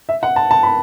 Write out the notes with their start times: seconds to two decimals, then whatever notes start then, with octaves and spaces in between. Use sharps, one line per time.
0.09 E5
0.23 F#5
0.36 A5
0.51 A5
0.63 B5